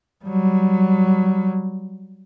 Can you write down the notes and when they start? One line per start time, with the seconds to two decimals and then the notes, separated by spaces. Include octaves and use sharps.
0.25 F#3 G3